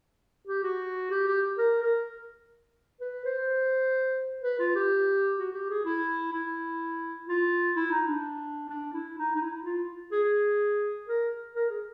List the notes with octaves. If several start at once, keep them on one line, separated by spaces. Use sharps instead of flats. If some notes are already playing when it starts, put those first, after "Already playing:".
G4
F#4
G4
G4
A#4
A#4
B4
C5
B4
F4
G4
F#4
G4
G#4
E4
E4
F4
E4
D#4
D4
D4
E4
D#4
D#4
E4
F4
G#4
A#4
A#4
G#4